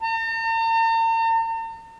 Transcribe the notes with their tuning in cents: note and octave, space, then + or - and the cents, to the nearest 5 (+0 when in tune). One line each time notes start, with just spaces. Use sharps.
A#5 -45